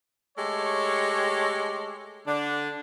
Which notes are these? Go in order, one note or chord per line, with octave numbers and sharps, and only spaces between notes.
G#3 A3 G4 A4 C#5
D3 D4